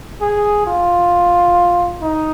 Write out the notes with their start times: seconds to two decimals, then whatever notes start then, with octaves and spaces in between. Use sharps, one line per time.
0.21 G#4
0.66 F4
2.01 D#4